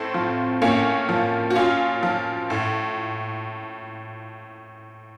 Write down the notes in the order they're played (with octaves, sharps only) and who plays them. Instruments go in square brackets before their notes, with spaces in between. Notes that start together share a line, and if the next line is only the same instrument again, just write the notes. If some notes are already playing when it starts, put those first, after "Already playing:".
Already playing: [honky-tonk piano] A2 A3 C4
F3
A2 A#3 C#4
F3
F#4
A#2 C#4 F4
F3
A2